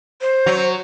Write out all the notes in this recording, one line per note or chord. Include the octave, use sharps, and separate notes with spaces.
C5
F#3